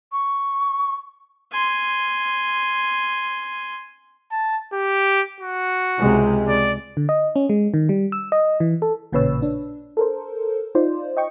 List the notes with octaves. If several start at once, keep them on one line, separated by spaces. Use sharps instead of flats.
C#6
G#5 C6
A5
G4
F#4
C#2 C3 G#3
D5
D3
D#5
C#4
G#3
D#3
G3
E6
D#5
E3
A4
A1 A#2 C#3 B4 C#5 E6
D4
A4 A#4 C5
D#4 F4 C5 D5
D#5 G5 C#6